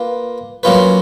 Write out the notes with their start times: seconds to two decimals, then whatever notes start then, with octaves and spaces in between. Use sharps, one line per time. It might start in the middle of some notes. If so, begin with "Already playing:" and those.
Already playing: A#3 F4 B4
0.63 F#3 A#3 C#4 F4 B4